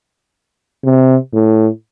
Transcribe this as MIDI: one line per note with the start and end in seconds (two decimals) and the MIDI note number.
0.84 1.16 48
1.33 1.67 45